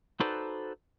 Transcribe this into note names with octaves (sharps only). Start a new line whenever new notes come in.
D#4 F#4 A4 B4 C5 D5